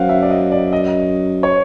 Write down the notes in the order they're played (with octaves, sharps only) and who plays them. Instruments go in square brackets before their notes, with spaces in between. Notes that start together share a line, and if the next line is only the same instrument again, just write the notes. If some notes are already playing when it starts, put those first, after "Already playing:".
Already playing: [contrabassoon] F#2 [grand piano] C5 F5 F#5
[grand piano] E5
D5
D#5
D5
D#5
C#5